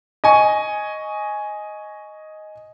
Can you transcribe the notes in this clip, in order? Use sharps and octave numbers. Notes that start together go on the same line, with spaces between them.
D#5 G#5 C#6